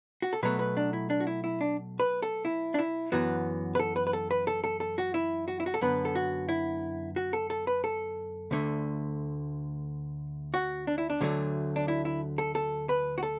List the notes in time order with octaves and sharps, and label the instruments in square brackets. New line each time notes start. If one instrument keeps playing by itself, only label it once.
[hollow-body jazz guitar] F#4
A4
B2 F#3 A3 B4
B4
D4
E4
D4
F#4
E4
E4
D4
B4
A4
E4
D4
E4
F#2 E3 B3 F#4
B4
A4
B4
B4
A4
B4
A4
A4
A4
F#4
E4
F#4
E4
F#4
A4
F#2 D3 B3 B4
A4
F#4
E4
F#4
A4
A4
B4
A4
D2 D3 A3
F#4
D4
E4
D4
D2 D3 F#3 A3
D4
E4
E4
A4
A4
B4
F#4
A4